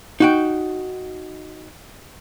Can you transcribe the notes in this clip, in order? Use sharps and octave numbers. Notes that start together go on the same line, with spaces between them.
D#4 F#4 G5